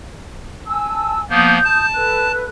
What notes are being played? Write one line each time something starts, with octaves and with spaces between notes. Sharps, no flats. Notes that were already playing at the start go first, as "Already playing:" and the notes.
G#5 A5 E6
F3 A#3 B3 D#6 G6
A5
A4 B4 F#6